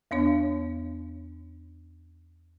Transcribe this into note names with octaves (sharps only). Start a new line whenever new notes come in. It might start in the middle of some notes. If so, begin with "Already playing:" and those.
E2 B3 D4 C#5